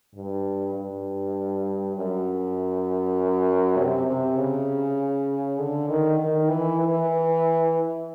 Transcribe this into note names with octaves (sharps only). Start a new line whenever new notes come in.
G2
G2
F#2
C3
C3
C#3
D3
D#3
D#3
E3
E3